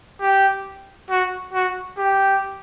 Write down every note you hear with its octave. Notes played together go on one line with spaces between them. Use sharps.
G4
F#4
F#4
G4